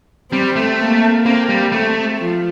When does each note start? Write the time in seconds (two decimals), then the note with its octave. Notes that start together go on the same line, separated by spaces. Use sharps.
0.32 G3 C4
0.56 A3
0.79 A#3
1.25 A#3 C4
1.49 G3
1.72 A3 C4
2.19 F3